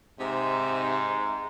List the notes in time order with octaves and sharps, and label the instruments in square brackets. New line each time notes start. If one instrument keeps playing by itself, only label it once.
[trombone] G#2 [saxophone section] C3 D#4 E5